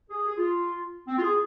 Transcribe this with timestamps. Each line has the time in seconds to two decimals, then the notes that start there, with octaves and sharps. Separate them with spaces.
0.10 G#4
0.28 G#4
0.38 F4
1.07 C4
1.17 F4
1.22 G#4